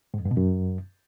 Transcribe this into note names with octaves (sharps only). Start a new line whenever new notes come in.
G#2
F2
G2
B2
F#2